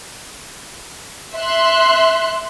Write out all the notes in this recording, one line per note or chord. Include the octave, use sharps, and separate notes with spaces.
E5 C6 F#6